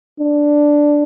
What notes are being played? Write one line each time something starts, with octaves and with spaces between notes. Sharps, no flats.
D4